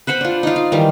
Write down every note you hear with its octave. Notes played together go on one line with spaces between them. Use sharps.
B4 C5 F#5 B5
D4 F4
D#4 F4
F5
D#3 E3 G3